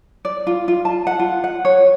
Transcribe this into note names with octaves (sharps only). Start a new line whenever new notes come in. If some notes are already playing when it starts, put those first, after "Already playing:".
D5
F4
F4
A5
F#5
F4
F#5
C#5